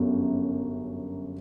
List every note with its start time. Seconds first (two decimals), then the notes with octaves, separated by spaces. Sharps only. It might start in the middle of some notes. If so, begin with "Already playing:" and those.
Already playing: G1 F#2